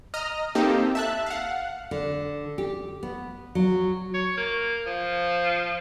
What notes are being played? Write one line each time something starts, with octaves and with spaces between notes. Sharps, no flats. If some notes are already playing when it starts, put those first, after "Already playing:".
D#5 A#5 D#6 F6
A#3 C4 D#4 G4 A4
E5 A5 F#6
F5 F#5
D3
G4
B3
F#3
C#5
A#3
F3